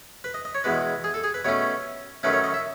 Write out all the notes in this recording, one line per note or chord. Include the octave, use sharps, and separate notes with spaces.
B4
D#5
D#5
C#5
E2 B2 G#3 B4
G#4
A4
G#4
B4
B2 A3 C#4 C#5
F#2 D#3 A3 C#4 B4
C#5
D#5
E5